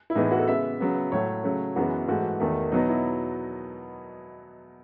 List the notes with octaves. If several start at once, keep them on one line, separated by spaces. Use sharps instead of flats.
E4
A2 E3 G#3 B3 D#4
E4
F#4
A4
C#3 G#3 B3 E5
C#3 F#3 B3
A2 F#3 A3 C#5
C#3 F#3 A3
F#2 E3 G#3 B3 F#4
G#2 E3 A3 F#4
E2 D#3 A3
B2 F#3 B3 D#4
E4